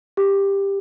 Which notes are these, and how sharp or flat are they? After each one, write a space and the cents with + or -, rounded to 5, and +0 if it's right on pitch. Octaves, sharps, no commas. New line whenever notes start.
G4 +10